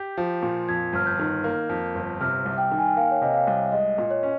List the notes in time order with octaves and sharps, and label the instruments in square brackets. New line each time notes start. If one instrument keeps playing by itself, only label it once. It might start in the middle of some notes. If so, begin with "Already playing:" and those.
Already playing: [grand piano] G4 [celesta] G6
[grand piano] F3
A#2
[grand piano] F2 [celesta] G#6
[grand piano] G1 [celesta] F6
[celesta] G6
[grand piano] D#3
A#3
F2
G1
[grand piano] C3 [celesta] F6
[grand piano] C2
[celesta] G5
[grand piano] D#3
[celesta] G#5
G5
[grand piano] A#3 [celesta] F5
[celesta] C#5
[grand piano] C3 [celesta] D#5
[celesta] F5
[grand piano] C2
[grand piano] G#3 [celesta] D#5
[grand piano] A#2
[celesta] C#5
[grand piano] C#4